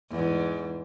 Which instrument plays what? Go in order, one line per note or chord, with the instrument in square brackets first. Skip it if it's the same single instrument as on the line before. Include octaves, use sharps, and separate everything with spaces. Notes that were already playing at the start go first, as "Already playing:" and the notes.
[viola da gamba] E2 G#2